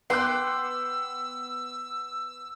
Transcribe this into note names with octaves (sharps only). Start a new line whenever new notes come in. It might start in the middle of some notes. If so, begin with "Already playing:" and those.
B3 G5 C6 D6 E6 F#6